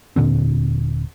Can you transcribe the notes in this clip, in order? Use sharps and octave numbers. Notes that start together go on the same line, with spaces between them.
D#1 A#2 D3 C4